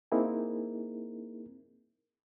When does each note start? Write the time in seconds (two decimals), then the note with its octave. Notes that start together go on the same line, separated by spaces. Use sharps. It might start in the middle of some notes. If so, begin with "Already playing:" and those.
0.12 A#3 C4 D#4 E4 G#4 A#4